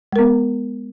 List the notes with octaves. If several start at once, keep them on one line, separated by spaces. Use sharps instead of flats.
G#3 B3 A#4